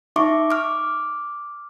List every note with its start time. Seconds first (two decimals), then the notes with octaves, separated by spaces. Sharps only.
0.16 D#4 E5 C#6 D6
0.51 D6 F6